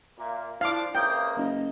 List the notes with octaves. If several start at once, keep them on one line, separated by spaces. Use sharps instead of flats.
A#2 A#3 E5
F3 D4 E4 F5 D6
C#2 C3 A#3 G5 D#6
F#1 D#5